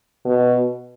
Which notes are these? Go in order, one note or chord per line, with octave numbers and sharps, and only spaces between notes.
B2